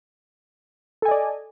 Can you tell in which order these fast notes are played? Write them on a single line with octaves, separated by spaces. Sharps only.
A4 G#5 D#5 D5